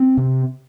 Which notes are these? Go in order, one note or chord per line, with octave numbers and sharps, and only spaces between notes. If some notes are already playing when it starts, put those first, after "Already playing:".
Already playing: C4
C3